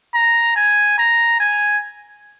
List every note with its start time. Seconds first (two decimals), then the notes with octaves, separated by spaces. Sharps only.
0.14 A#5
0.56 G#5
0.98 A#5
1.40 G#5